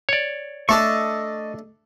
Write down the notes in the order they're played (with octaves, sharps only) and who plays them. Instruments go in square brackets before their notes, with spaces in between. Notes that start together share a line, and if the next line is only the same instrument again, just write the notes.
[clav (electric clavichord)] C#5 D5
[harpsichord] A3 D4 A4 [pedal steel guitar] D#5 A5 C#6